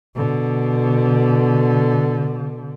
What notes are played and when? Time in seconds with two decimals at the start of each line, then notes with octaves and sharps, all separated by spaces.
0.15 B2 D3